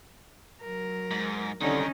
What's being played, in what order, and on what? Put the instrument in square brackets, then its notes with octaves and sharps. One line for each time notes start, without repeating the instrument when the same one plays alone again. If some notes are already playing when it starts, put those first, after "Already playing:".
[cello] F#3 A#4
[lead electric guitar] G#2
[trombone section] C2 D3 [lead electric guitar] D#3 [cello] C#4 D#4